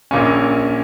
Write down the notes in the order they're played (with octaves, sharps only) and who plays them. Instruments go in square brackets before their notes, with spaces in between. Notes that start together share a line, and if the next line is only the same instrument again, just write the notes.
[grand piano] A#1 A#2 A#3 C#4